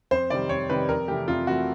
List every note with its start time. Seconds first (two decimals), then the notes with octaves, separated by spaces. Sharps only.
0.11 F2 C5
0.30 C3 D#3 G3 D5
0.49 F2 C#5
0.69 C3 D#3 G3 B4
0.89 F2 A#4
1.08 C3 E3 A3 G4
1.28 F2 F4
1.47 C3 E3 A3 F#4